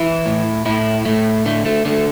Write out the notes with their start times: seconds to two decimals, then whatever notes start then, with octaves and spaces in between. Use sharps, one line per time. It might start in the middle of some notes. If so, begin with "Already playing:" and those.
Already playing: E3 E4
0.26 A2
0.66 A2 E4
1.05 A2 A3
1.46 D3 A3
1.66 A3
1.85 D3 A3